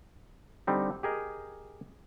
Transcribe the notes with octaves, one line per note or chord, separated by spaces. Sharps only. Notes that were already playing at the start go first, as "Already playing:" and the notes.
D3 G3 C4 D#4
G4 G#4 A#4 D#5